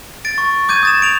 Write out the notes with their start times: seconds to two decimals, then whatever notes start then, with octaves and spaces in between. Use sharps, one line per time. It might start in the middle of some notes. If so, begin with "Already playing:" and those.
0.25 A6 D7
0.38 C#6
0.69 D6 G6 G#6 D#7
0.83 D#6 A6 E7
1.02 D7 F7